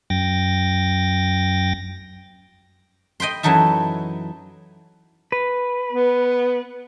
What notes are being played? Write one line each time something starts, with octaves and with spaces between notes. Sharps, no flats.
F#2 G5 A6 A#6
D#5 G5 B5 C6
F#2 E3 F#3 D#4 A4 E5
B4
B3